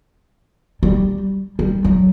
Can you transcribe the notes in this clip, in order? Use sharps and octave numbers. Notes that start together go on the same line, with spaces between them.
G3
G3
F#3